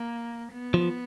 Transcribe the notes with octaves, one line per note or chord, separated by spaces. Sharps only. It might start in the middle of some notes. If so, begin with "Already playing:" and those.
Already playing: A#3
B3
F3